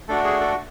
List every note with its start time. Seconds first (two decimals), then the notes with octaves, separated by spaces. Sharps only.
0.08 A3 D4 F#4 A4
0.24 G#4
0.41 A4